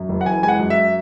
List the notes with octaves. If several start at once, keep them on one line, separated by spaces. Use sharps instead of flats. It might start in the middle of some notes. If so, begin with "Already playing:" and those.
Already playing: F#2
F#1
F#5
E3 G#5
G#3 G#5
F#5
F#2
E5